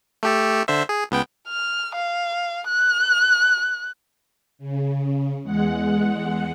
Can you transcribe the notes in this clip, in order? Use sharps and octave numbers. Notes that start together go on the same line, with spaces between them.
A3 G4 A4
D3 C5 E5
G#4
C#2 B3 G5
F6
F5
F#6
C#3
E2 G#3 F#5